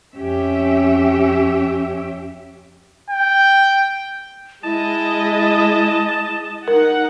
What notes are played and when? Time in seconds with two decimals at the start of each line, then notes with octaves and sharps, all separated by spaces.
0.17 F2 C#4 G4 E5
3.10 G5
4.64 G#3 E4 D#5 A5
6.68 D#4 A#4 F#5